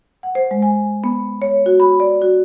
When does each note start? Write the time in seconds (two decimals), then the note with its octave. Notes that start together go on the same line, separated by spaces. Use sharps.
0.23 F#5
0.35 C5
0.51 G#3
0.62 G#5
1.04 B3
1.42 C#5
1.66 F#4
1.80 B5
2.00 D5
2.22 F#4